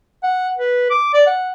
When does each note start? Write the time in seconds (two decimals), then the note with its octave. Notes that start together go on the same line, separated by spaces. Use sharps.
0.23 F#5
0.57 B4
0.90 D6
1.13 D5
1.26 F#5